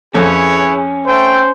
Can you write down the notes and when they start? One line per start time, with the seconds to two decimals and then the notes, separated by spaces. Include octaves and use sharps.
0.14 F2 C#4 E4 G#4 A4 B4 C#5
1.07 A3 C5 G5